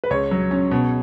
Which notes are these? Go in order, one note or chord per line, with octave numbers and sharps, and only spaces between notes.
B4
C#2 C#5
F#3
C#4
B2